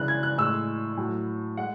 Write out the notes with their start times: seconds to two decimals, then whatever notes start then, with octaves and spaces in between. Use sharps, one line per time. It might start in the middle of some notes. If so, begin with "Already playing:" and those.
Already playing: C#3 E3 G#3 F#6
0.08 G#6
0.23 F#6
0.37 A2 G#3 E6
0.97 A2 F#3
1.57 G#3 F#5